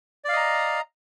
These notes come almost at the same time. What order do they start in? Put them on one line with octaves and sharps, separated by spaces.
D5 F5 D#5 A#5